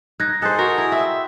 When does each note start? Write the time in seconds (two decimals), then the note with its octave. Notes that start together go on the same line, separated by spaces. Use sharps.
0.20 D#4 F#6 G#6 A#6
0.42 G#4 A4 C5 D#5 F#6 A6
0.59 F#4 A#4
0.78 E4
0.92 C4 E5